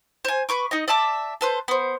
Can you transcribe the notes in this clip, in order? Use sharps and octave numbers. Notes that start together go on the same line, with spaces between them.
C5 G#5
B4 C#6 D6
D#4 D#5
D5 E5 A5 D6
A4 B4 C5
B3 C5